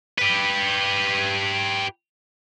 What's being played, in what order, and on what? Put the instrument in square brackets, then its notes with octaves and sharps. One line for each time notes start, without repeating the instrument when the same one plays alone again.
[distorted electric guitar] G4 B4